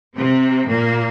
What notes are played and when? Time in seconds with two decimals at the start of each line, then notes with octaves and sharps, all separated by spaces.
0.17 C3 C4
0.69 A#2 A#3